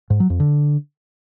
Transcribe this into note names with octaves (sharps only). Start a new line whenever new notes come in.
G#2
F#3
F2
D3